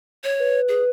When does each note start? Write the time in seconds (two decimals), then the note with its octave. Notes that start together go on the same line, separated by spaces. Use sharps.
0.24 C#5
0.40 B4
0.68 G#4